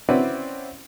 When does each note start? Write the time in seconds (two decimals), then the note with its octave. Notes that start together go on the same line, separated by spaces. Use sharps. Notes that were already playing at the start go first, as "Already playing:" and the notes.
0.09 C4 C#4 E4 F#4 B4 D5